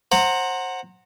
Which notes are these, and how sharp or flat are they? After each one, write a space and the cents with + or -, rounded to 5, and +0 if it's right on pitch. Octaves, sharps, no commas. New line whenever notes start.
C5 +25 F#5 +0 A#5 -20